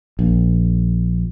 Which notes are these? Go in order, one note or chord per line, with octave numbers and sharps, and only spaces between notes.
A#1